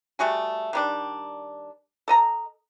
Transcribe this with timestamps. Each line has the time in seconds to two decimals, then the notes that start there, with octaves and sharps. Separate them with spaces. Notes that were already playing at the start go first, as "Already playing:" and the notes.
0.19 G3 A3 F#4 G#4
0.73 D#3 G3 D4
2.08 A4 D#5 A#5